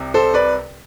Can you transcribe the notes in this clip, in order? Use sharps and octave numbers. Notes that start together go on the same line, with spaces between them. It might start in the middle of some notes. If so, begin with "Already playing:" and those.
Already playing: C2 C3
A4 C5
B4 D5